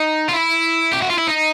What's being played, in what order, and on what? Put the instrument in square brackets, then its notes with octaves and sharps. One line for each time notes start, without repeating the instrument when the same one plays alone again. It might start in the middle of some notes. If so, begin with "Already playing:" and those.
Already playing: [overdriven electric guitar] D#4
F4
E4
G4
F#4
F4
E4
D#4